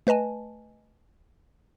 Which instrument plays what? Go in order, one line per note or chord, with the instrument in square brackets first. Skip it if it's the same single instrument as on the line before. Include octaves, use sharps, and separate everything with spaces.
[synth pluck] A3 B4 D#5 G#5 A5